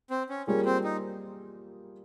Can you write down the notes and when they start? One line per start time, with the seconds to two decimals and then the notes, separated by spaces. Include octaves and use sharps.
0.10 C4
0.30 C#4
0.47 G3 A#3 C#4 F4 G#4
0.65 C4
0.84 D#4